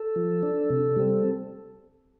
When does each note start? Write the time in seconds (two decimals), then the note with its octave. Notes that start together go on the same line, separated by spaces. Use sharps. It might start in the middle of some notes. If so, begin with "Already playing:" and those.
Already playing: A4
0.16 F3
0.43 D4
0.70 C3
0.96 G3 C4